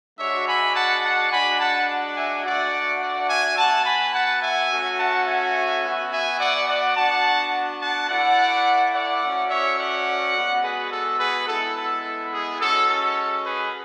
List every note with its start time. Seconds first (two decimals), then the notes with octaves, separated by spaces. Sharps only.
0.19 G#3 D4 F#4 C#5 E5
0.47 G#5 B5
0.76 F#5 A5
1.04 F#5 A5
1.32 G#3 D4 F#4 G#5 B5
1.61 F#5 A5
2.17 E5 G#5
2.45 A3 D4 F#4 D5 F#5
3.02 D5 F#5
3.30 E5 G#5
3.58 B3 F#4 F#5 A5
3.86 G#5 B5
4.14 F#5 A5
4.43 E5 G#5
4.72 A3 C#4 F#4
4.99 F#5 A5
5.27 E5 G#5
5.84 B3 F#4
6.12 E5 G#5
6.40 D5 F#5
6.69 D5 F#5
6.97 B3 D4 F#4 F#5 A5
7.82 F#5 A5
8.10 A3 E4 D5 F#5
8.94 D5 F#5
9.22 A3 C#4 F#4
9.51 C#5 E5
9.79 D5 F#5
10.36 G#3 B3 F#4
10.64 G#4 B4
10.92 A4
11.20 G#4 B4
11.48 G#3 B3 E4 A4
11.77 A4
12.33 G#4
12.61 G#3 C#4 F#4 A4
12.89 A4
13.46 G#4 B4